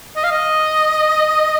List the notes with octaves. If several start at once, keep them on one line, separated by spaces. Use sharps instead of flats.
D#5
F5
D#5